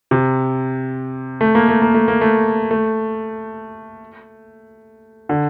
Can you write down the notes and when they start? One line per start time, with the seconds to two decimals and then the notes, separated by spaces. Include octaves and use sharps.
0.11 C3
1.41 A3
1.55 A#3
1.68 A3
1.82 A#3
1.94 A3
2.08 A#3
2.21 A3
2.71 A3
5.29 D3